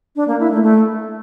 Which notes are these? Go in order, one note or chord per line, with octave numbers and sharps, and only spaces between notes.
D4
A#3
E4
A3
A3